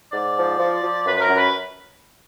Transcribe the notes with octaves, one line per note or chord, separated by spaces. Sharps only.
G#2 D5
F3
F3
F3
F#2 B4
B4
A#4
F#2
B4